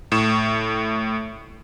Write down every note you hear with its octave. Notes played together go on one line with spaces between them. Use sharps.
A2 C#6 E7